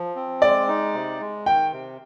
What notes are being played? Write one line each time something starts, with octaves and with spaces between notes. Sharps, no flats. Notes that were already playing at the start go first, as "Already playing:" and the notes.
Already playing: F3
C4
G#3 D5
D#4
C3
G#3
D#3 G5
C3